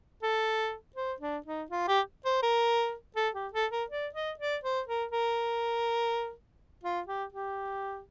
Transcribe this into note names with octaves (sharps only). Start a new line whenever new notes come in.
A4
C5
D4
D#4
F4
G4
C5
A#4
A4
G4
A4
A#4
D5
D#5
D5
C5
A#4
A#4
F4
G4
G4